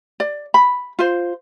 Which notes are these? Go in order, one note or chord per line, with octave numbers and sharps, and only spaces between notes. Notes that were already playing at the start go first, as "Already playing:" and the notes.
D5
B5
F4 C5